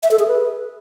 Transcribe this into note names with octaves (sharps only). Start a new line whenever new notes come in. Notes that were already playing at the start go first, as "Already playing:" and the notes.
E5
A4
G#4
B4